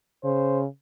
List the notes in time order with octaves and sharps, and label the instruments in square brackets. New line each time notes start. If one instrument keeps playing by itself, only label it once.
[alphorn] C#3 [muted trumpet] C5